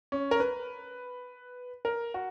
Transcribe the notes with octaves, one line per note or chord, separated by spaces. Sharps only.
C#4
A#4
B4
A#4
F#4